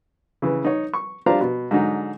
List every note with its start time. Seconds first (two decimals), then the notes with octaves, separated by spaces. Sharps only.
0.42 C#3 E3
0.64 D#4 C#5
0.94 C#6
1.26 D4 F4 G4 C5 F5 A#5
1.41 B2
1.71 G#2 D3 F#3 D#4